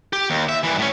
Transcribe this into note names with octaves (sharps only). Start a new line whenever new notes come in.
G4
D#2
E5
G2 E3
A2 C#4